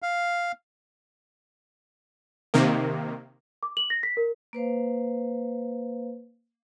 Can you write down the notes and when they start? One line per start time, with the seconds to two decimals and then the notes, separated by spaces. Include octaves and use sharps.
0.02 F5
2.54 C3 D#3 A#3
3.63 D6
3.77 F#7
3.90 A#6
4.03 B6
4.17 A#4
4.53 A#3 B4 C5 F5